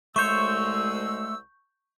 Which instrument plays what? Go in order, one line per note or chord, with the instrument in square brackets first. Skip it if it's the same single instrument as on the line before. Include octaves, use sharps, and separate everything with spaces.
[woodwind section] C2 G#3 E6 [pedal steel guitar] A3 C5 C#5 [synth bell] C#6 G6